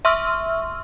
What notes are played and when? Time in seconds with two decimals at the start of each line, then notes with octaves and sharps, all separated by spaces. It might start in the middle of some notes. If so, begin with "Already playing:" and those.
0.05 E5 C6 C#6 E6 F6